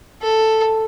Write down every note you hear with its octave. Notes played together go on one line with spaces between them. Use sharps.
A4